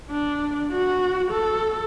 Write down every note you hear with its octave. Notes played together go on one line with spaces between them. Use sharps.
D4
F#4
A4